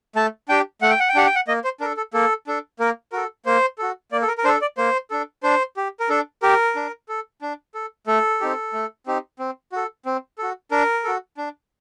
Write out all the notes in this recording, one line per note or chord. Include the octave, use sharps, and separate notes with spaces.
A3 A5
D4 G4 G5
A3 F#5
G5
F#5
G5
D4 G4 F#5
G5
F#5
A#3 D#5
C5
D4 A4 A#4
A4
A#3 A4
D4 A4
A#3 A#4
F#4 A4 A#4
A#3 C5
F#4 A4
A#3 D5
A4
A#4
A#4
D4 A4 C5
D5
A#3 C5
D4 A4
D4 C5
G4
A#4
D4 A4
G4 A#4
D4
A4
D4
A4
A3 A4
C4 D#4 G4
A3
C4 D#4 G4
C4
F#4 A4
C4
F#4 A4
D4 A#4
F#4 A4
D4